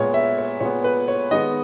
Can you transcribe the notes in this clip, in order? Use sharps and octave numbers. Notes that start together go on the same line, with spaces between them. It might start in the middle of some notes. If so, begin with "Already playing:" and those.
Already playing: A#2 G#3 B3 C#5
E5
C#5
A#2 G#3 B3 C#5
B4
C#5
D#3 G#3 B3 D#5